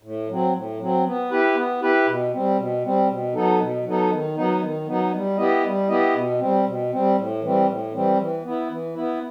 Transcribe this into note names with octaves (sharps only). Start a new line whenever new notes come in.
A2
F#3 C4
A2
F#3 C4
B3
E4 G4 B4
B3
E4 G4 B4
B2
G3 C4
B2
G3 C4
B2
F#3 B3 D#4 A4
B2
F#3 B3 D#4 A4
D#3
F#3 B3 D#4
D#3
F#3 B3 D#4
G3
B3 E4 G4 D#5
G3
B3 E4 G4 D#5
B2
G3 C4
B2
G3 C4
A2
E3 G3 C4
A2
E3 G3 C4
E3
B3 E4
E3
B3 E4